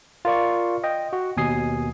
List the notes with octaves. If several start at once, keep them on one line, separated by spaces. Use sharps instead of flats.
F4 A#4 D5 C#6
D#5 G5
F#4
D#2 B2 G#5 D#6 C7